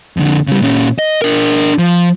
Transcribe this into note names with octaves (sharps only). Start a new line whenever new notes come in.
F2 D3
C#3 G3
A#2 C#4
D#5
D4 A#4
F3